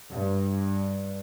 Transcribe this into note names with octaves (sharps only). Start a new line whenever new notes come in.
G2